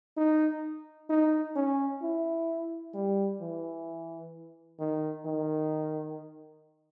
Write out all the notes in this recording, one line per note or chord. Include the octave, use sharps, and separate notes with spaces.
D#4
D#4
C#4
E4
G3
E3
D#3
D#3